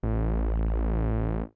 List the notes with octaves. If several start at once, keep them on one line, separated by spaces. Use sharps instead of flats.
A1